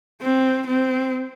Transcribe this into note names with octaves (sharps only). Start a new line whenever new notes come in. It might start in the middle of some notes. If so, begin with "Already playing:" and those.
C4
C4